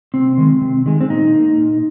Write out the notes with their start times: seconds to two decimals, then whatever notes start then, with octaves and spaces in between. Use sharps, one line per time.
0.14 C3 C4
0.38 D#3 G#3
0.61 C3
0.86 D#3 G#3
1.01 C4
1.10 A#2 D#4
1.34 A#3
1.57 A#2